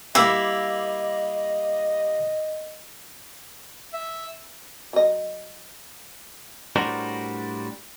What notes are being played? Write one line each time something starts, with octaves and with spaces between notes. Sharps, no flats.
G3 A#3 E4 D#5
E5
F#3 D#5
A2 G3 D4 F#4 A#4 C5